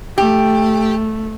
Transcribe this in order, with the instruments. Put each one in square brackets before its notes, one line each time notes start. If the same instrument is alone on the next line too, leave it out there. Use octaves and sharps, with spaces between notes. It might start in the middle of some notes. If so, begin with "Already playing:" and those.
[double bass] A3 [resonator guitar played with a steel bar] G4